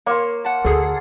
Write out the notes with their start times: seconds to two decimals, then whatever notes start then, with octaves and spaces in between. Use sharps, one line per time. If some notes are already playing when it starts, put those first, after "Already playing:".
0.06 A#3 C#5 C6
0.45 F#5 A5
0.65 D2 G#4 A4